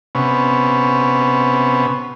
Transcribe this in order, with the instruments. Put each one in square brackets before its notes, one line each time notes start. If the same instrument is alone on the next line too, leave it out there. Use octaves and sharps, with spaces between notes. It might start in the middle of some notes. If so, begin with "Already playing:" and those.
[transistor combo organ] C3 B3 C#4